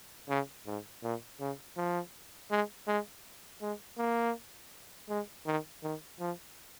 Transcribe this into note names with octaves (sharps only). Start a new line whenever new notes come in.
C#3
G#2
A#2
C#3
F3
G#3
G#3
G#3
A#3
G#3
D#3
D#3
F3